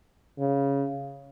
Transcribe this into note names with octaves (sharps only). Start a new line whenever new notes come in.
C#3